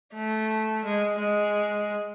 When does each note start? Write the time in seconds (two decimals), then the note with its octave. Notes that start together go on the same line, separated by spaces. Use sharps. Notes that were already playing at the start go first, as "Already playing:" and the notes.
0.14 A3
0.85 G#3
1.19 G#3